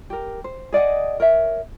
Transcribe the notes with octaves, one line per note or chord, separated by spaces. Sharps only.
G4 A#4
C5
G#4 D5 D#5 F#5
A#4 C#5 E5